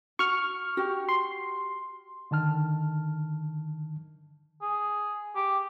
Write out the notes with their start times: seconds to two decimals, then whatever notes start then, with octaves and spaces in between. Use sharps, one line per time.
0.19 F#4 C#6 F6
0.77 F#4 G4
1.09 C6
2.31 D3 D#3 A5 F6
4.62 G#4
5.36 G4